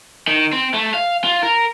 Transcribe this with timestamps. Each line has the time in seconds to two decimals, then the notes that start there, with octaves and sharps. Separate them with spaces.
0.28 D#3
0.53 C4
0.74 A3
0.94 F5
1.24 F4
1.43 A#4